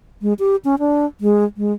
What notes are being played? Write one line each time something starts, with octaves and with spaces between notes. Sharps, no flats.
G#3
G4
C#4
D4
G#3
G#3